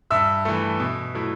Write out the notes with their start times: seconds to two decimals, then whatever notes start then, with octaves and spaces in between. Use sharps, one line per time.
0.11 G2 E5 E6
0.45 E3 A3
0.80 B2
1.14 F#3 A3 E4